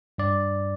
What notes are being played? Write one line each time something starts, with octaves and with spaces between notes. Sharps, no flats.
G2 D5